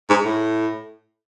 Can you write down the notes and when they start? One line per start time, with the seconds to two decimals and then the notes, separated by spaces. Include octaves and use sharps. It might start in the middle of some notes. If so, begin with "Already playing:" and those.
0.10 G#2
0.25 A2